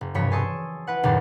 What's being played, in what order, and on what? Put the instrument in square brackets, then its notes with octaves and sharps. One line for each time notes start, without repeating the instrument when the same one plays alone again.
[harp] F#1
E1 C2 G2 F3 C#5 B6
G#5 A5 C6 C#6 D#6 E6
E4 B4 F#5
F#1 D#2 A#2 F5 A#5 A6